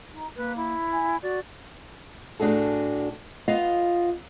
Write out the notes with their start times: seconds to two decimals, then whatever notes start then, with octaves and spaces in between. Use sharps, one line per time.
0.13 D#4
0.36 A#3 B4
0.56 E4
0.92 G#5
1.22 F#4 D5
2.40 A2 D4 F#4 G#4 A4
3.48 B3 F4 D#5 F5